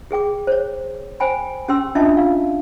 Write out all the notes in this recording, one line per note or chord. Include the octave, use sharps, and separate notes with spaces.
G4 G#4 G5 D6
C5 C#5
C5 G5 G#5 B5
C#4 G4 G5 C6 E6
C#4 D4 F4 D#5 E5 A5
F4 F5